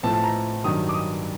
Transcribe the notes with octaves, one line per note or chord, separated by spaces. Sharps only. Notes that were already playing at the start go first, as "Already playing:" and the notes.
A2 F3 A3 C4 A5
A5
A#5
G2 D#3 F#3 D#6
D6
D#6